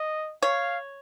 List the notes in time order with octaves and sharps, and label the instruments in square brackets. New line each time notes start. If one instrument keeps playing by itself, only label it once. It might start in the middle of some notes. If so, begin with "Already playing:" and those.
Already playing: [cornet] D#5
[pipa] C#5 [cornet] F5